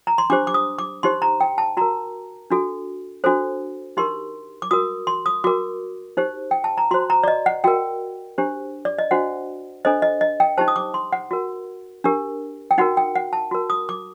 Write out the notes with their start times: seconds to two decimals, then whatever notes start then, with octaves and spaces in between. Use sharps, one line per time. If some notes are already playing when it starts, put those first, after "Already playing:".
0.07 A#5
0.18 C6
0.30 D4 G4 C5 D6
0.47 D6
0.54 D#6
0.79 D6
1.03 D#4 G4 C5 C6
1.22 A#5
1.41 G5
1.58 A5
1.77 F#4 A#4 A#5
2.50 D4 F#4 A4
3.24 D4 F#4 A4 C5
3.97 D#4 G4 A#4 C6
4.62 D6
4.71 F#4 A#4 D#6
5.07 C6
5.26 D#6
5.44 F#4 A#4 D6
6.17 D#4 G4 C5
6.51 G5
6.64 A5
6.78 A#5
6.91 F#4 C5 C6
7.10 A#5
7.24 D5
7.28 D#5
7.46 F#5
7.64 F#4 A#4 G5
8.38 D4 G4 C5
8.85 D5
8.99 D#5
9.11 D4 F#4 C5 F#5
9.85 D4 A4 C5 D#5
10.02 D#5
10.21 D#5
10.40 G5
10.58 D#4 G4 C5 A5
10.68 D#6
10.76 D6
10.94 C6
11.13 F#5
11.31 F#4 A#4
12.04 D4 G4 A#4
12.71 G5
12.78 D#4 F#4 A#4 F#5
12.97 G5
13.15 F#5
13.33 A5
13.51 F#4 A#4
13.70 D#6
13.89 D6